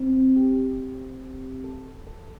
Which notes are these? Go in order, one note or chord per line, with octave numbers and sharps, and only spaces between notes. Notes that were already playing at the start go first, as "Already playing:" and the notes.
Already playing: C4
G4
A4
A4